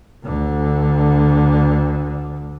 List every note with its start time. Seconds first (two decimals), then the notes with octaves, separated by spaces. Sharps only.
0.25 D2 D3